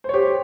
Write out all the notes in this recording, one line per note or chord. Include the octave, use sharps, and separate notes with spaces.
G4 C5 C#5